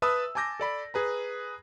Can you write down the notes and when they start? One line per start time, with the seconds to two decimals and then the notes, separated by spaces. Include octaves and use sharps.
0.02 B4 E5 A5 B5 D#6 E6
0.35 G#5 A5 D6 G6 A#6
0.60 A4 D5 B5
0.94 G#4 B4 A#5